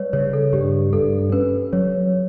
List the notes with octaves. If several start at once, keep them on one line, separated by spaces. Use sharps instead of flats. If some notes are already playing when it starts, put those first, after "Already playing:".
Already playing: G3 B4 C#5
C#3 C#5
A4
G2 G4
G2 A4
C#4 B4
F#3 C#5